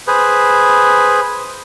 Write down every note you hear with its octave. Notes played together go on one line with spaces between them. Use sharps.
G#4 B4 C5